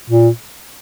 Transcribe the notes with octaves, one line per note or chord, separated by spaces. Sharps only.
A#2